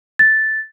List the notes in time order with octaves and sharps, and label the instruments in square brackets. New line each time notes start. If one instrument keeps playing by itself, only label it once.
[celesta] A6